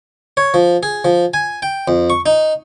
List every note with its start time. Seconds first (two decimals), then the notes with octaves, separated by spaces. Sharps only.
0.37 C#5
0.54 F3
0.83 G#4
1.05 F3
1.34 G#5
1.62 G5
1.88 F2
2.10 C#6
2.26 D#4